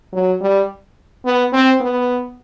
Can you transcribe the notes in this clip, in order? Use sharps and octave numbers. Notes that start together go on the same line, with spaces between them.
F#3
G3
B3
C4
B3